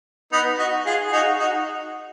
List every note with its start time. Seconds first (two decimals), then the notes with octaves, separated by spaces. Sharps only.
0.32 B3 D#4
0.58 D#4 F#4
0.86 F4 G#4
1.08 G#4
1.12 D#4 F#4
1.39 D#4 F#4